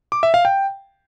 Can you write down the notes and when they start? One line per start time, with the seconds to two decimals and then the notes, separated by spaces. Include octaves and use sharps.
0.12 D6
0.23 E5
0.34 F5
0.45 G5